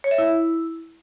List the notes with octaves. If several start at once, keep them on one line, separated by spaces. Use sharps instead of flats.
C#5
E5
E4